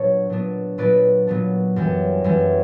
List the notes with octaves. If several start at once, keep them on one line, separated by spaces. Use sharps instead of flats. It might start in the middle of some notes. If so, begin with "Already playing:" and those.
Already playing: A#2 F#3 B3 D4 C#5
A#2 F#3 B3 D4
A#2 F#3 B3 D4 B4 D5
A#2 F#3 B3 D4
F#2 E3 G3 C#4
F#2 E3 G3 C#4